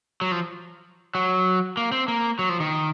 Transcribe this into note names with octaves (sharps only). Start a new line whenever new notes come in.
F#3
F3
F#3
A#3
C4
A#3
F#3
F3
D#3